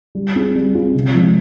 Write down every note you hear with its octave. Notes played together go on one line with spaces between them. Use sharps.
G3
C4 F4 G#4
G3
C4 F4 G#4
C3
F3 G#3 C4